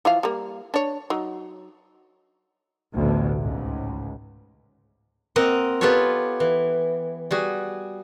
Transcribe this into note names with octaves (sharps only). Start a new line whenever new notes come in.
E3 F3 F5
G3 A#3
D4 C#5
F#3 D#4
A1 D2 B2 D3
C#2 G#2
A#3 C4 A#4 D#5 F#5
B3 F4 G4 A4 B4 C#5
E3
G3 F#4 G#4